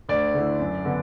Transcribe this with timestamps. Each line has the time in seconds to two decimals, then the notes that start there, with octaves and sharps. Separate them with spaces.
0.09 D2 D5
0.34 D3 A3 E4
0.60 F#2
0.85 D3 B3 D4